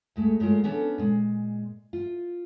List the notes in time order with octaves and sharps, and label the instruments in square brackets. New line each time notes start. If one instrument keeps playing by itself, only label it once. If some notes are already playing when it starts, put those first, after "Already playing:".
[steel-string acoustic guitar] D2 G#3 A3
F#3 G#3 A3 F4 A#4
B3 C#4 D4 A4
A#2 G#3
F4